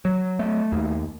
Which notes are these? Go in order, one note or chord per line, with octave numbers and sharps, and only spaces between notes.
F#3
A3
D#2